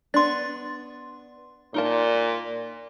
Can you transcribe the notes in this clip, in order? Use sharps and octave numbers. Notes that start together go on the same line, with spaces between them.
B3 D4 C6 A6
A#2 D#4 A#4 A5